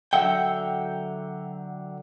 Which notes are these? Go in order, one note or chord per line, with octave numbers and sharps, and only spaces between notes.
D3 F#3 E5 F#5 G5